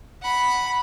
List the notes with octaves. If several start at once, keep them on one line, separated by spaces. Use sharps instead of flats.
F#5 B5